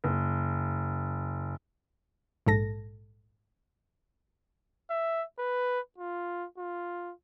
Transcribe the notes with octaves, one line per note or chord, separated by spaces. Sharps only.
F#1
A#1 G#2 A4 A#6
E5
B4
F4
F4